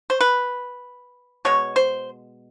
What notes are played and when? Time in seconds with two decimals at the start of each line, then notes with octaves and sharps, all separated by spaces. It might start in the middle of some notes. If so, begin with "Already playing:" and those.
0.10 C5
0.21 B4
1.45 B2 G#3 C#5
1.76 C5